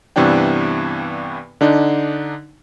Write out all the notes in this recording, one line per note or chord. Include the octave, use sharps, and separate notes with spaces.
G2 C3 E3 B3 D4 G5
D3 D4 D#4